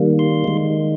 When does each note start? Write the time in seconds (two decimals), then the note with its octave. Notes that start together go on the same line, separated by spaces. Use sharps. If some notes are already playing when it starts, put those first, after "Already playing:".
Already playing: D#3 G3 A#3
0.19 C6
0.44 D#3 G#3